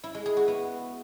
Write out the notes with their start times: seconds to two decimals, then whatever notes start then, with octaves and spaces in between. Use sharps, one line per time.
0.04 E4
0.15 G#3
0.26 G#4
0.37 F#4
0.48 B3